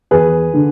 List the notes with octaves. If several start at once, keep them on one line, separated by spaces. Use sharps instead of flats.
E2 G#4 B4
D3